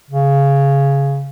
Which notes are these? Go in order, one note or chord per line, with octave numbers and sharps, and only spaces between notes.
C#3